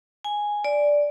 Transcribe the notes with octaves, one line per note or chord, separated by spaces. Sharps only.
G#5
D5